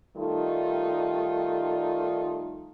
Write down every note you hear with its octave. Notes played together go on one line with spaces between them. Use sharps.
D#3 G3 A3 D#4 F4